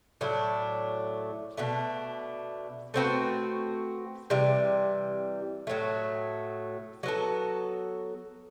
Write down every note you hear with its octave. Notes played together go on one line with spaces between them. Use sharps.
A2 F#3 A3 D4
B2 A3 D4
A3 C4 F#4 B4
C3 E3 G3
A2 F#3 A3
F#3 B3 F#4 A4